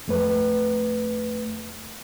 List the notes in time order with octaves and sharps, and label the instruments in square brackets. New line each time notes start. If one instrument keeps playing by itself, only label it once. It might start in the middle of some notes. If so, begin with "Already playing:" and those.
[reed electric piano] F2 A3 B4